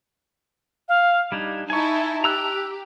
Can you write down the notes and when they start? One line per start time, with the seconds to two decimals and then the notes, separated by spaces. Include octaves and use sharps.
0.88 F5
1.32 G3 D4 D#4 G#6
1.70 D#4 E4 G#5 A5 C#6
2.24 G4 A#5 E6 F#6